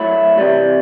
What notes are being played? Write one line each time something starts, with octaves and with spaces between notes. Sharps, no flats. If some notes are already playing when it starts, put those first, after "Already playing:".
Already playing: F#3 A3 E4
C3 E3 G3